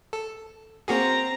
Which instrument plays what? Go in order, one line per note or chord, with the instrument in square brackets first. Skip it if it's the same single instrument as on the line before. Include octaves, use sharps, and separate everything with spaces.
[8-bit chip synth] A4
[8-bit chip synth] A#3 F#4 G#4 [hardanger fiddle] C4 A#5